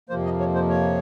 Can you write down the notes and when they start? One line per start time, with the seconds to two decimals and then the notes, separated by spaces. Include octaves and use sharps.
0.09 F2 C3 F3 A#3 C5
0.25 D#5
0.40 C#5
0.55 C5
0.69 C#5